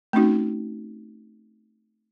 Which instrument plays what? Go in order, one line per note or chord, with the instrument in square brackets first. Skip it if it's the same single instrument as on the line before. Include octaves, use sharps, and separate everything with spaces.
[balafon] A3 C4 C#4 D#4 F#4